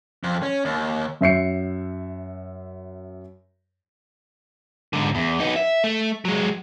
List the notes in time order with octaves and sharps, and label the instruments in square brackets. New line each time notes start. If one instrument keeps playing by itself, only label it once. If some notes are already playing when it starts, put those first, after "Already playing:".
[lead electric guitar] F2
C#4
D#2
[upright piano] F#2 E5 C7 C#7
[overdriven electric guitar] G#2 D3
E2
B3 D#4
E5
A3
F#3 G#3